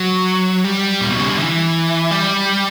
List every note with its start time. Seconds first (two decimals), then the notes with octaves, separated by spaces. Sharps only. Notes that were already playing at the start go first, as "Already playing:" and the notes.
Already playing: F#3
0.64 G3
1.01 A#2
1.10 B2
1.19 C#3
1.29 D3
1.37 E3
2.11 G3